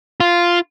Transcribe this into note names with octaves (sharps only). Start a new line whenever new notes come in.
F4